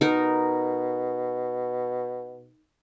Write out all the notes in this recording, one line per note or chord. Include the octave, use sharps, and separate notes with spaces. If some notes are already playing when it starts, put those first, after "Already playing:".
B2 D#4 A#4